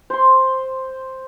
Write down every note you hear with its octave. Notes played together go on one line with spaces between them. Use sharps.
C5 C6